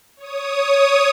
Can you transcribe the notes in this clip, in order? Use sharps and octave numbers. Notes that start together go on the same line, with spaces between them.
C#5 D#6